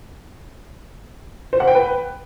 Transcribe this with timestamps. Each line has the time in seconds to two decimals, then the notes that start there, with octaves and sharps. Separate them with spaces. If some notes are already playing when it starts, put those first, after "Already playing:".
1.53 C5
1.60 F#5
1.68 G5
1.75 B4